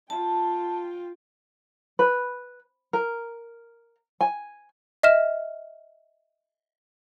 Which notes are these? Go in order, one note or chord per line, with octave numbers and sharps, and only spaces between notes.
F4 G5 A5
B4
A#4
G#5
D#5 E5 F6 E7